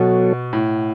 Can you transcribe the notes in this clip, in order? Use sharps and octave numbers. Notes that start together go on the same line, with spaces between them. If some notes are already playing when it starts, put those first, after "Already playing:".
Already playing: B2 F#3 B3 F#4 A4 C#5
A2